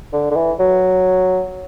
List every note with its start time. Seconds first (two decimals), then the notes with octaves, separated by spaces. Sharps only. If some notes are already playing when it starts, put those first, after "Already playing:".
0.13 D3
0.31 D3
0.36 E3
0.60 F#3